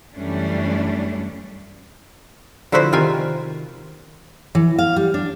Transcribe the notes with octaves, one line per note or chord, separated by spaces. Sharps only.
F#2 E3 G3 A3 C#4 D4
D3 F3 E4 F#4 B4 C5
C3 D#3 F4 G5 G#5
E3
F5
G3
D4